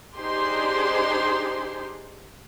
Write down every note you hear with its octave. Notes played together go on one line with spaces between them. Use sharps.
D4 D#4 G4 G#4 C5 C6